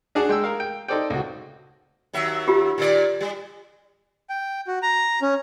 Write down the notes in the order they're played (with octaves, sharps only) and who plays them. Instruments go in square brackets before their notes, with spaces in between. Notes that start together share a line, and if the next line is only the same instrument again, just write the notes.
[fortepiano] D4 F#4 G#4 D5 F#5 A5
G#3 G5 E6
A#4 F5
G5
D#4 A4 C5 D5 G5
C#2 F#4
[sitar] D#2 F#3 E5
[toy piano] F4 G4
[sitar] A#2 D#3 D5
G3
[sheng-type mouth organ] G5
F#4
A#5
C#4